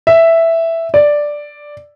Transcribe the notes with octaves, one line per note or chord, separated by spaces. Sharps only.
E5
D5